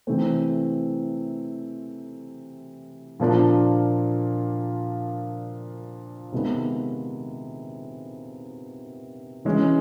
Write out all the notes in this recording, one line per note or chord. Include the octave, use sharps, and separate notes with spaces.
C3 E3 A3 C4
A#2 F3 A#3 D4 F4
C3 D#3 G#3 B3
E3 G#3 C#4